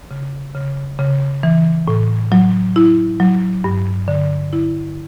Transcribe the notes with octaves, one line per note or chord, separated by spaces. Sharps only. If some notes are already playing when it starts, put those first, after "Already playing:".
C#3
C#3
C#3
E3
A2
F#3
E4
F#3
G2
D3
E4